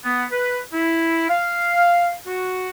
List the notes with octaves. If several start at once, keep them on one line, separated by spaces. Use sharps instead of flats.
B3
B4
E4
F5
F#4